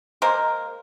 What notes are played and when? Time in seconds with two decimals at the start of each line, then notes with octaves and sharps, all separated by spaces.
0.22 G#3 A#3 A#4 C5